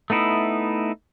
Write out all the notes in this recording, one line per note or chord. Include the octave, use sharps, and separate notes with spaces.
A3 B3 D#4 E4